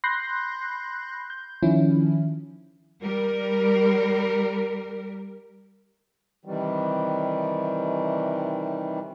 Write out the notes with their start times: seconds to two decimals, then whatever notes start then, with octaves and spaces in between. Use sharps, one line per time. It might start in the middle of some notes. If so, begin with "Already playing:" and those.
0.04 B5 C6 F#6 G6 A#6 C7
1.30 G6
1.62 D#3 F3 C#4 D4 E4
3.02 G3 A#4
6.45 C3 D#3 E3 G3